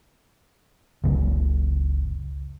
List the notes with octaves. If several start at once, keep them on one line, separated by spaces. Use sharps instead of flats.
F#1 C#2 F#2